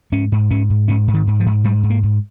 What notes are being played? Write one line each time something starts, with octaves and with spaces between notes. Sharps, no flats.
G#2 C#4
G#2
G#2 C#4
G#2
G#2 C#4
G#2
D#3
G#2
F3
G#2
G#2 G3
G#2
A#3
G#2